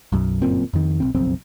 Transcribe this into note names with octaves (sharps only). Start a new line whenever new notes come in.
B1 F#2
G1 F#2 A#2 C4
F2 D#3
B1 E2 C4
F#1 B1 F2 C4